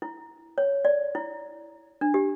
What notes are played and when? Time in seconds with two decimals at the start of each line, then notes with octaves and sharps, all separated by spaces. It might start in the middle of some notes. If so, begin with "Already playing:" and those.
0.02 E4
0.58 C#5
0.85 D5
1.15 E4
2.01 D4
2.14 G4